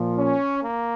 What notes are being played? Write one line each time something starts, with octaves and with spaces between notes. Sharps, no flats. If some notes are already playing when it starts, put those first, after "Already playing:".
Already playing: A#2 F3
C#4
A#3